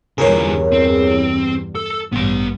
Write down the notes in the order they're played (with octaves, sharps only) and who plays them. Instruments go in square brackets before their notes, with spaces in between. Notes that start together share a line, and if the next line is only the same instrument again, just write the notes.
[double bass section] E2 G2 [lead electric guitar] D3 F4 [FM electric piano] G#4 A#4 C#5
[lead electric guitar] C4
[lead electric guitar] A4 [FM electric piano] E6
[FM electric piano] A1 [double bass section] G2 [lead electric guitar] B3 C6